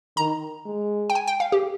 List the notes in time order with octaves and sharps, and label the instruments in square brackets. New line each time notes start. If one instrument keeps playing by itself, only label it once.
[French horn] D#3 [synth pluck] A#5
[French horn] G#3
[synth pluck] G5
G#5
G5
F5
G4